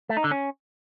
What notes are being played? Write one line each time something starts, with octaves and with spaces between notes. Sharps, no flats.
A3
D#4
D3
C#4